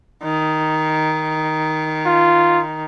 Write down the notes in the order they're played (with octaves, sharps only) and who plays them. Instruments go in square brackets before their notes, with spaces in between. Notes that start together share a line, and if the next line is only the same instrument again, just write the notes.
[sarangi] D#3
[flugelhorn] F4